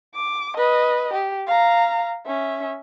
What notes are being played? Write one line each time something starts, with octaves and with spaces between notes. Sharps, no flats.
D6
B4 D#5
G4
F5 A#5
C#4 E5